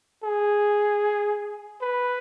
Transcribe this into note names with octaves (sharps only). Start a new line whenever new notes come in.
G#4
B4